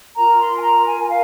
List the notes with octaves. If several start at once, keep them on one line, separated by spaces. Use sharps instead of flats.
F4 A#4 A#5
C6
G#5
A#5
G#5
G#5
A#4 F5